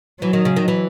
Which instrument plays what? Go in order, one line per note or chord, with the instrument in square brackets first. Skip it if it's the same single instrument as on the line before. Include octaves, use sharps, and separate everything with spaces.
[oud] E3 [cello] F#3
[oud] D#3
C#3
D#3
E3